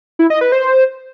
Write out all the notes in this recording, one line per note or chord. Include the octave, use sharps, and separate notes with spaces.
E4
D#5
B4
C5